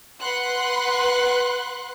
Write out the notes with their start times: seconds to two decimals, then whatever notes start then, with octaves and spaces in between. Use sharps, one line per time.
0.20 B4 F#5 C6 F#6